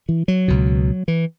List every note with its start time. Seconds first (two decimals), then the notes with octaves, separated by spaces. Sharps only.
0.09 E3
0.28 F#3
0.48 C#2 B2
1.08 E3